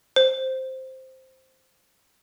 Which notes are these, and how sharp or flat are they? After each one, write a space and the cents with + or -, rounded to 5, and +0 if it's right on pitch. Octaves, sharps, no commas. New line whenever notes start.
C5 +0